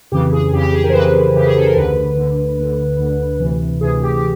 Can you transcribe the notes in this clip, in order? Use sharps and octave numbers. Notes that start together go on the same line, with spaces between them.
F2 C#3 E3 G4
G#4
F2 C#3 E3 G4
G4
G#4
A#4
C5
F2 C#3 E3 B4
F2 C#3 E3 G4
G#4
A4
A#4
D2 D3 B4
D2 D3
D2 D3
D2 D3
D2 C3 E3
D2 C3 E3 G#4
G4
G4